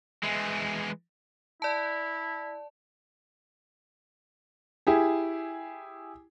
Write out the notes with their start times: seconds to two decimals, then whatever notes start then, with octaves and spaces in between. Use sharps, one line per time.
0.23 E3 G#3
1.62 E4 D5 A5
4.87 E4 G4 G#4